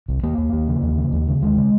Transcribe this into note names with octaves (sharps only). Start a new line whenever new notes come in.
C2
D#2 A#3
D#2
D#2
C#3
D#2
C#3
D#2
C#3
D#2 G#3
C#3